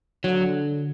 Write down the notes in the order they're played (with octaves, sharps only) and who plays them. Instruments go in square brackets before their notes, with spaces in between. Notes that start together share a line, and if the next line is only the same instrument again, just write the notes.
[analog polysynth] D3 [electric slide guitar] F#3